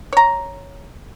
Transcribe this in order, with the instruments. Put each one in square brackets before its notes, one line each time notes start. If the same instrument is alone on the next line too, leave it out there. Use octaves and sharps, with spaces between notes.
[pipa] C#5 A#5